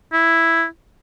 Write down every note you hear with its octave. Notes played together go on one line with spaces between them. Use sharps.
E4